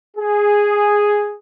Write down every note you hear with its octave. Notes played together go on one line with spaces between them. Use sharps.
G#4